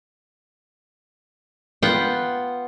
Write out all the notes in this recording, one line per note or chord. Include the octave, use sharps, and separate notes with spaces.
B3 F4 F#5 G5